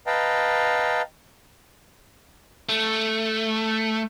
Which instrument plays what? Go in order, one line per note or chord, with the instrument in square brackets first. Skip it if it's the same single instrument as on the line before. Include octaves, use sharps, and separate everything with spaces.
[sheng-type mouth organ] B4 D#5 F5 G5 A5 A#5
[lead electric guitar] A3